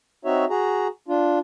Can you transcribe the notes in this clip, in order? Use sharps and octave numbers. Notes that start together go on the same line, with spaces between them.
C4 D#4 F#4 C#5 E5
F#4 G#4 A#5
D4 F4